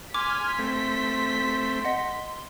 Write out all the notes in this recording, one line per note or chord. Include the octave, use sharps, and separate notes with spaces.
G#5 C6 D6 F6 B6
A3 C4
D#5 F#5